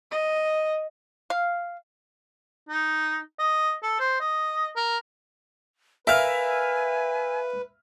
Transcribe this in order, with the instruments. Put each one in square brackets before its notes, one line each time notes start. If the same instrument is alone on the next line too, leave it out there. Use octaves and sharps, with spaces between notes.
[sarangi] D#5
[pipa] F5
[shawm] D#4
D#5
A4
C5
D#5
A#4
[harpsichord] A#4 F5 [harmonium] B4 [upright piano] E5 F6 [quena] G#5